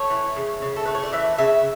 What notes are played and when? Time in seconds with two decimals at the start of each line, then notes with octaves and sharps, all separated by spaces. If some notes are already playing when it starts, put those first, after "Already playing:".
Already playing: A3 C#5
0.10 E3
0.36 C#3
0.62 C#3
0.76 A4
0.85 A3 B4
0.95 C#5
1.03 D5
1.13 E3 E5
1.38 C#3 E5